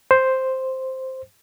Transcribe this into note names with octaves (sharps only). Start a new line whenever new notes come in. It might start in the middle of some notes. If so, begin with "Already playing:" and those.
C5